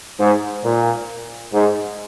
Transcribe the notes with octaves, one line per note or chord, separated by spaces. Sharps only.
G#2
A#2
G#2